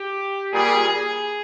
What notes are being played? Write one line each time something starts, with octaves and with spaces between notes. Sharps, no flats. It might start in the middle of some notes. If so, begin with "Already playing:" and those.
Already playing: G4
A#2 G3 G#4
G#4